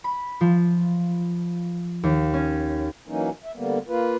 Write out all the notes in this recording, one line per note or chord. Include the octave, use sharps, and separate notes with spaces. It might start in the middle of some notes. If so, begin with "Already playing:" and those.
B5
F3
D#2
C#4
E3 F#3 A#3 C#4 D#4
E5
D3 G3 A#3 B3
A#3 F4 B4